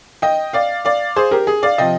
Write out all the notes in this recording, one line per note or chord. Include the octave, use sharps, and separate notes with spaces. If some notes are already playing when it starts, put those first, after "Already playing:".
D#5 G5
D5 F5
D5 F5
G#4 C5
G4 A#4
G#4
D5 F5
C3 F3 D#5 G5